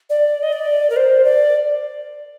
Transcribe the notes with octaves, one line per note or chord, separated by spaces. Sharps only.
D5
D#5
D5
A#4
C5
D5